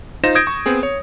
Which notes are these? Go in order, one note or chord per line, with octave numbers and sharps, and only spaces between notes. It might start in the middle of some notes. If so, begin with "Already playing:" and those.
D#4 F4 C5 C6 A#6 E7
D#6 G6 G#6 A#6 D7
C#6
B3 C4 G#4
C#5